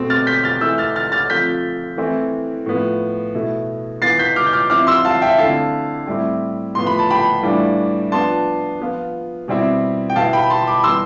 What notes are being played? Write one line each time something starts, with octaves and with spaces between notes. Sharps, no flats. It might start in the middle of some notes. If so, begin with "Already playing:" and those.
Already playing: B2 A3 C4
F6 A6
G6 B6
F6 A6
E3 A3 E4 E6 G6
F6 A6
F6 A6
F6 A6
F3 A3 C4 G6 B6
E3 A3 C4 E4
A2 F3 B3
B2 A3 E4
E3 B3 F4 A6 C7
G6 B6
D6 F6
G6
D6 F6
F3 C4 E4 D6 F6
C6 E6
F5 A5
E5 G5
D3 A3 C4 E4 F5 A5
A2 G3 C4 E4
A2 F3 B3 C6
B5
A5
G5 B5
A2 E3 G3 D4 F4
F3 B3 D4 A5 C6
F3 B3 F4
B2 G3 C4 E4
G5
B2 B3 E4 F5 A5
G5 B5
A5 C6
B5 D6
E3 G3 B3 C6 E6